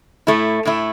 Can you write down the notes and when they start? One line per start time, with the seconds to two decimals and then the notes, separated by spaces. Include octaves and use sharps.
0.27 A2 A3 E4
0.65 A2 A3 E4